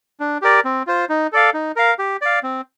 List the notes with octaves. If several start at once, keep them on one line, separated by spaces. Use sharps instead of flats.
D4
G4 A#4 D5
C4
F4 C5
D#4
A4 D5 F5
D#4
A#4 F5
G4
D5 F5
C4